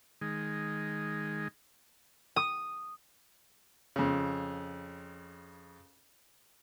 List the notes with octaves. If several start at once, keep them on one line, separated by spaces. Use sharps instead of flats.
D#3 G#3
D#6
F2 C#3